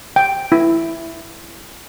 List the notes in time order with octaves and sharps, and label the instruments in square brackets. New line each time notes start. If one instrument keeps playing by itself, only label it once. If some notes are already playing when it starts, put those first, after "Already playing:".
[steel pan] G5
E4